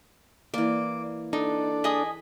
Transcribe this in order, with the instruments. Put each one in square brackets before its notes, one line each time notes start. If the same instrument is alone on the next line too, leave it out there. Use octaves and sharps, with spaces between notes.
[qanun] E3 A#3 [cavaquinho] D5
[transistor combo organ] D4 A4 D5 [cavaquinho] D#4
[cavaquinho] G#4 D#5 D#6 [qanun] B5